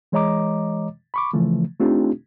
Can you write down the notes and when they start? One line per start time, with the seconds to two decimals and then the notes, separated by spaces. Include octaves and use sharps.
0.12 E3 G#3 C#5 D#5 A#5 D6
1.14 B5 C#6 D6
1.33 C#3 E3 F3 A3
1.80 A3 C4 D4 D#4 F4 G4